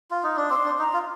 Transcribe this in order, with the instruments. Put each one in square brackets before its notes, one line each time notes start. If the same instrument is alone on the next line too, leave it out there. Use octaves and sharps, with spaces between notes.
[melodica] F4
D#4
D4
[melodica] C4 [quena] C6
[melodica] D4
[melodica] D#4 [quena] A#5
[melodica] F4